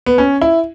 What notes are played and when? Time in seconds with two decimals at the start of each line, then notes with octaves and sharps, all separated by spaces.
0.06 B3
0.18 C#4
0.42 E4